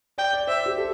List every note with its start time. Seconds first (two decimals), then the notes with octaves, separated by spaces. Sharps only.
0.18 D5 G5
0.33 D5
0.47 C5 E5
0.66 G4
0.78 A4